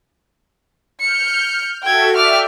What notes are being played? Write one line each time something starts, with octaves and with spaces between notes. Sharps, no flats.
F6 G6 C#7
F#4 A4 E5 G5 G#6
D5 E5 G5 D6 F6